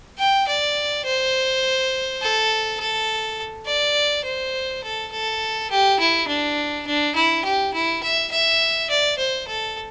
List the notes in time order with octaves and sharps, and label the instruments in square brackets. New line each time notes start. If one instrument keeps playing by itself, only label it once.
[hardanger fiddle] G5
D5
C5
A4
A4
D5
C5
A4
A4
G4
E4
D4
D4
E4
G4
E4
E5
E5
D5
C5
A4